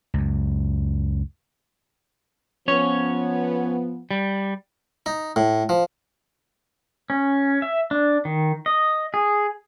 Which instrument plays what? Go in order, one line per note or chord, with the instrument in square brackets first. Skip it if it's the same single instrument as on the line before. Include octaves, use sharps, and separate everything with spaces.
[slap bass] C#2 F#2
[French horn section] F3 B3 [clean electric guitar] C#4 C#5
[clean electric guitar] G3
[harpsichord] D#4
A2
F3
[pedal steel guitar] C#4
E5
D4
D#3
D#5
G#4